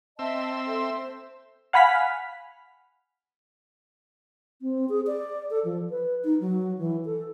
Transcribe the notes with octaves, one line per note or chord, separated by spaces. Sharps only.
C4 D#5 E5 A5 E6
A4 E5 C6
C5
F5 F#5 G#5 B5 F6 B6
C4
G#4
D5
A4
F3
B4
D#4
F#3
E3
A4